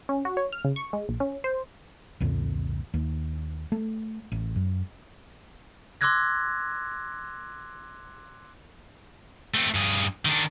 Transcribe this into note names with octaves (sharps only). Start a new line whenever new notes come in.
C#4
F#4
C#5
F6
C#3
C#6
G#3
A#1
C#4
C5
C2 F2 A#2 D3
D#2
A3
A1
F#2
C6 D6 E6 F#6 G#6 A#6
A3 C4
G2 G#4
D#3 D4